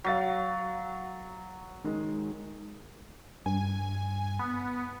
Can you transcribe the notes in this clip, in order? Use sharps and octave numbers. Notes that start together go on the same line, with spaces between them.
F#3 F5 A6 B6
D#3 G#3
G2 G#5
B3